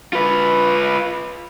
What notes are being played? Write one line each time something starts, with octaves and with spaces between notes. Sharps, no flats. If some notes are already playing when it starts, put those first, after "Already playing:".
F4 B4